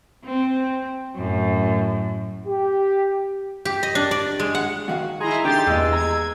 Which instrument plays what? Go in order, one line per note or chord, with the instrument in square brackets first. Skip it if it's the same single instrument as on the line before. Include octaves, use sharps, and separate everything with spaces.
[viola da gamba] C4
F#2 A2
[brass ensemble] G4
[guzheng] G4
D#5
D4
D5
G#3
F#5
[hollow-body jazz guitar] G#2 D#3 F5 [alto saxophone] F#4
[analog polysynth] E4 D#5 A#5 [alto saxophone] G#4 [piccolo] C6
[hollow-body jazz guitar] D3 D#3 [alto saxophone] G4 [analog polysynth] C6 A6 [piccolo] G6
[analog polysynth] E2 [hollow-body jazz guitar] A#2 D#5 [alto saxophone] G#3 [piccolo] E6
[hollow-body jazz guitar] A#5 [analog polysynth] G#6